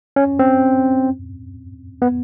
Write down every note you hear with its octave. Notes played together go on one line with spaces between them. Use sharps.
C#4
C4
B3